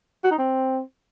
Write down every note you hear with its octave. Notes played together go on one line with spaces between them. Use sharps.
F#4
D#4
C4